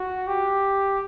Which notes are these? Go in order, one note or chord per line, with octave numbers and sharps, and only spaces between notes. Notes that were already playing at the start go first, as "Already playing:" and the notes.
Already playing: F#4
G4